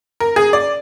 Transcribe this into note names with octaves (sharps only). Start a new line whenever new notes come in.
A#4
G#4
D5